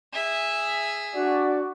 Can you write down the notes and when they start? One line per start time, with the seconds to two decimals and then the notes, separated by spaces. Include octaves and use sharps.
0.13 G#4 E5
1.15 D4 F#4 D5